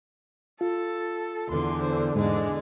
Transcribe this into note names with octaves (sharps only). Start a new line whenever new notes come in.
F4 A4
E2 D3 C6
C5
E2 G#2 D3 G#3